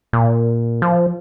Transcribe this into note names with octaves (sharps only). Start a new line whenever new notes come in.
A#2
F3